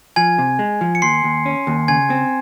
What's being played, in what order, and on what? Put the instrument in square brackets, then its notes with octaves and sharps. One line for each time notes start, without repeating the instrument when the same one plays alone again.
[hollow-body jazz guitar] F3 [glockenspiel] G#5 G#6
[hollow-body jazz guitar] C3
G#3
F3
[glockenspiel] C#7
[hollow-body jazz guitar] D#2 [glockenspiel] C6 C7
[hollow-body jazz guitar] D#2
C#4
D#2
[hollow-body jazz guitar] C#3 [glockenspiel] G#5 G#6
[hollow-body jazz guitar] C4